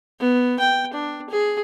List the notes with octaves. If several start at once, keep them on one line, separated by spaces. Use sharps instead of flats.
B3
G5
D4
G#4